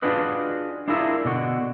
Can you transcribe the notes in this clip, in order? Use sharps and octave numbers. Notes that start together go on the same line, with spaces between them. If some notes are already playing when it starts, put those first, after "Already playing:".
D4 F4 F#4 G#4 B4 D#5
D4 E4 F4 G#4 A#4 E5
B2 D3 F#4